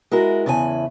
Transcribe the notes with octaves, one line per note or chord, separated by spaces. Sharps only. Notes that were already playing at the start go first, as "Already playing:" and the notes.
G#3 E4 F#4 A#4
E2 C#3 E4 B4 G#5 A5